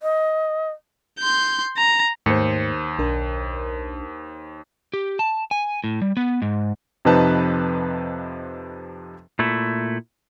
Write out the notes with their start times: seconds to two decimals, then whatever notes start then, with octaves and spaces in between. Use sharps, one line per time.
0.03 D#5
1.19 C6 G6
1.77 A#5
2.26 D#2 G#2 A3 C5 C#7
2.99 B1 D4 A#4
4.94 G4
5.19 A5
5.51 G#5
5.84 A2
6.02 G3
6.17 B3
6.42 G#2
7.05 F2 C3 F3 D#4 B4 A5
9.39 A#2 A3 E4